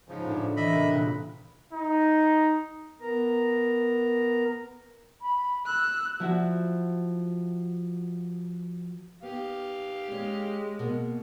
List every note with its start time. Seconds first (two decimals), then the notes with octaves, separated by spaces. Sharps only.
0.08 G#2 C#3 F3
0.25 A2 C#4 D4
0.57 E3 D#5 E5 B5
0.70 C3 G4 A#4
0.91 A#2 C#3 B4 F#6
1.71 D#4
3.01 B3 A#4 A#5
5.22 B5
5.66 E6 F#6
6.20 F3 E4 F#4
9.23 B3 G4 F5
10.12 G#3 C#4
10.79 B2 A#3